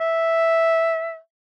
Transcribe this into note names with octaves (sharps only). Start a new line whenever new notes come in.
E5